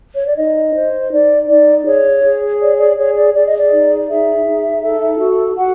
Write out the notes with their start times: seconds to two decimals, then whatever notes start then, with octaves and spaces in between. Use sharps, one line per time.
0.14 C#5
0.26 D5
0.37 D#4 D#5
0.74 C5
1.11 D#4 D5
1.48 D#4 D5
1.86 G#4 C#5
2.23 G#4
2.60 C#5 D5
2.79 D5
2.97 G#4 C#5
3.16 D5
3.34 G#4 D5
3.46 D#5
3.58 D5
3.71 D#4
4.08 G#4 E5
4.46 D#4
4.83 A4
5.20 F#4
5.57 F#4 F#5